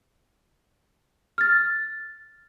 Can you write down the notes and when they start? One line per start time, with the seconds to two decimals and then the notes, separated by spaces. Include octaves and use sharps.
1.38 F6 A6